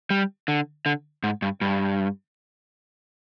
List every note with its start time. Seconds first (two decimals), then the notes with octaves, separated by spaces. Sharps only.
0.10 G3
0.48 D3
0.86 D3
1.24 G#2
1.42 G2
1.61 G2